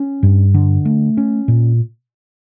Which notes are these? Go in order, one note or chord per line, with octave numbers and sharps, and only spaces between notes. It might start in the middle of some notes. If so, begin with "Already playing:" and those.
Already playing: C#4
G2
D3
A3
C#4
A#2